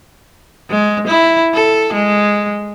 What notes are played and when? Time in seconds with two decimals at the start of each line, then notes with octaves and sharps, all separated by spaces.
0.70 G#3
1.07 E4
1.54 A4
1.93 G#3